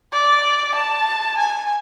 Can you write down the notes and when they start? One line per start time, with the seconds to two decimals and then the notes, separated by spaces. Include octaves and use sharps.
0.13 D5
0.74 A5
1.37 G#5